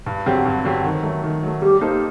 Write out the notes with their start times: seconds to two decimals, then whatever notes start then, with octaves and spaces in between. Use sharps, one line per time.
0.06 G2
0.26 D3 F#3 C4 G4
0.45 G2
0.65 D3 F#3 C4 G4
0.84 D#3
1.03 F#3 A3
1.24 D#3
1.43 F#3 A3
1.62 G3 G4
1.81 A#3 D#4 A4 C5